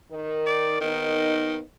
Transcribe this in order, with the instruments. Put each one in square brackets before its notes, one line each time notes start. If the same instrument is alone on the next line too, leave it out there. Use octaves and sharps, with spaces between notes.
[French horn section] D#3 A#4
[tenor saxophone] D5
[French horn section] D#2 B3 D#4 [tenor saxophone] D#3